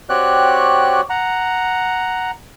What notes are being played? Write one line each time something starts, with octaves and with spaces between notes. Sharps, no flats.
C4 F#4 G4 C#5 D5 F#6
F#5 A#5